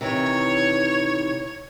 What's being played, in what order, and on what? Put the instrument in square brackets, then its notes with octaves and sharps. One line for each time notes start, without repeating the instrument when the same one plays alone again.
[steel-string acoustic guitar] C3 D#3 E3 [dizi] C#5